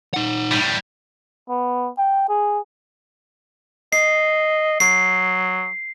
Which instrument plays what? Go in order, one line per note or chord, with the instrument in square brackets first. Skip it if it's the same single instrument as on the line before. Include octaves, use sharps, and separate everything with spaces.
[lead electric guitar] D#4 F#5
[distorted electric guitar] A2 G3
[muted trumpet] B3
G5
G#4
[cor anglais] D#5 [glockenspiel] C7
[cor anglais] F#3 [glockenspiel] C7